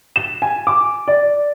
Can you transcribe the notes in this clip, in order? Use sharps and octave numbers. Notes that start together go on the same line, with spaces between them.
E7
G#5
D6
D5